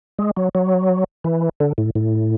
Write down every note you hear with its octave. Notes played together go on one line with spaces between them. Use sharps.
G#3
F#3
F#3
E3
D3
A2
A2